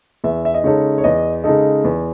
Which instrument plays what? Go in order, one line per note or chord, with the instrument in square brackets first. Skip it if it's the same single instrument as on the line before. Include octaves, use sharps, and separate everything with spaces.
[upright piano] E2 [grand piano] E5
[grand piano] E5
D#5
[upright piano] C#3 G#3 D#4 A4 [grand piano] C#5
[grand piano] C#5
[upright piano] E2 [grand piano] D#5
[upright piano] C#3 G#3 D#4 A4 [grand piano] D#5
[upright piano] E2